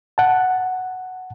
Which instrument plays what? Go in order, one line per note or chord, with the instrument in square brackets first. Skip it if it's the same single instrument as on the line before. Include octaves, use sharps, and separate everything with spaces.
[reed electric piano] F#5 A5